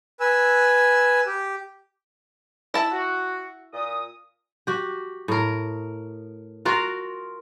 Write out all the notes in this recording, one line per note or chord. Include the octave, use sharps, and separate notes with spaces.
B4 G#5 E6
G4
E4 A5
F#4
A#2 D#6
F#4 G4
A2 A#4
F4 F#4 A#4 F5